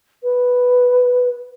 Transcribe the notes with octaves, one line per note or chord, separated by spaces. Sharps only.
B4